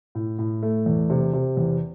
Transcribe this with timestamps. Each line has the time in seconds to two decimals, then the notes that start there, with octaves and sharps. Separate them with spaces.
0.15 A2
0.39 A2
0.63 A3
0.86 E2
1.10 C3
1.33 C3
1.57 E2